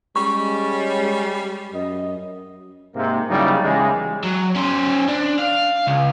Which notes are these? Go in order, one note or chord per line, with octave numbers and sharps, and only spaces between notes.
G3 G#3 C#4 C#6
F#2 D#5
G#2 C3 A#3
C#3 F#3 G3 A#3 D#4 E4
E2 C#3 E3 G3 G#3
F#3
C#4 C5
D4
F5
C#2